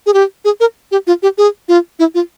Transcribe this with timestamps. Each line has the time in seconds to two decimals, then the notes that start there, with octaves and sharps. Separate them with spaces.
0.06 G#4
0.14 G4
0.45 G#4
0.60 A#4
0.91 G4
1.07 F4
1.23 G4
1.38 G#4
1.68 F4
1.99 E4
2.15 F4